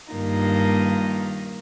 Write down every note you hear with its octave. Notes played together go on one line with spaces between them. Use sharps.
G2 D#3 A#3 D#4 F4